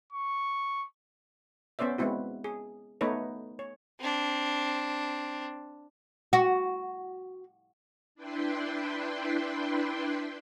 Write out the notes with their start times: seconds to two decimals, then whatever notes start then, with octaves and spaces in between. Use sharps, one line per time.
0.12 C#6
1.79 B3 C#4 C5 D5 E5
1.98 G#3 B3 C4 E4 F#4
2.44 G#4
3.01 A3 B3 D#4 B4 C#5
3.59 C#5
4.00 C4 D4
6.33 F#4
8.15 D4 E4 B4 G5 C6